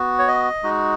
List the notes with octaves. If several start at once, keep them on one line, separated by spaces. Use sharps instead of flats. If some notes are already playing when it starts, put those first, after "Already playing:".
Already playing: B3 F#4
C#5
D#5
G#3 D#4 F#4